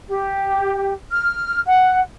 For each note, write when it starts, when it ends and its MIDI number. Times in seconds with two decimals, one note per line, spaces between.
0.09 0.92 67
1.11 1.61 89
1.67 2.00 78